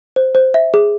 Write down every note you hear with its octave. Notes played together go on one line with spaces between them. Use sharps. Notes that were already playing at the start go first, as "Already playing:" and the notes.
C5
C5
E5
G#4